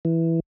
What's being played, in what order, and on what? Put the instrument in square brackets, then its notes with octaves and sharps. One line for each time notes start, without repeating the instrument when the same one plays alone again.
[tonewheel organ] E3